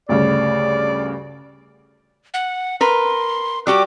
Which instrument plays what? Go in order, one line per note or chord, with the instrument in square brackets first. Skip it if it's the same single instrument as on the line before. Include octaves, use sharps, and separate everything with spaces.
[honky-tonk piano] D2 G2 C#3 [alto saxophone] D5
[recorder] F#5
[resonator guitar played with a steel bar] A#4 B4 [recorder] C6
[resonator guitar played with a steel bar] G3 F#4 G4 [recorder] D6